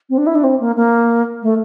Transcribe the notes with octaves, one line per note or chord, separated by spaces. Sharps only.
C4
D4
E4
D4
C4
A#3
A#3
A3